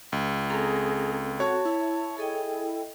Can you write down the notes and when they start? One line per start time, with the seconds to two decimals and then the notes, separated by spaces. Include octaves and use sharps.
0.12 C#2
0.50 C4 G#4 A4 A#5
1.40 F#4 C#5 A5
1.65 E4
2.18 G#4 A4 D#5 G5